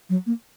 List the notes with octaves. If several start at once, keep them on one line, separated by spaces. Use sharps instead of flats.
F#3
A#3